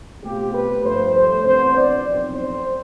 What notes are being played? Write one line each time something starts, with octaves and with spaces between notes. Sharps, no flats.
B2 A3 C4 F4 G4
B4
G2 F3 A3 C5
C5
C2 C3 E3 B3 D4 C5
D5
B1 A2 F3 C4
C5